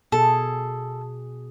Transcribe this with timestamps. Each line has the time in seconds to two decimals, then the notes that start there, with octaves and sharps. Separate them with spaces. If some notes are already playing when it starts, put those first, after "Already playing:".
0.12 B2 G#4 A4